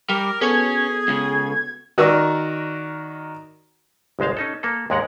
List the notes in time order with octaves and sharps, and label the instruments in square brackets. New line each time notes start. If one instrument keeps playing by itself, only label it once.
[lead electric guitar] G3 [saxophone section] A#4 [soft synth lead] D6
[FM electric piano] B3 F#4 A4 [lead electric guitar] C#4 C#5 [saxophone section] G#4 [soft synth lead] G#6
[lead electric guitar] C#2 C#3
[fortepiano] D#3 F#4 A#4 D5 E6
[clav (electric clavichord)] G1 C2 G#3 C5 F5
C#4 D#4 A4
A#3 A4
D#2 G#2 G#3 A#4 F#5